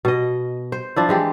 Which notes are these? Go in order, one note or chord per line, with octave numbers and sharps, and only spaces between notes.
B2 D#5
C5
F3 D4 E4
E3 G#3 G4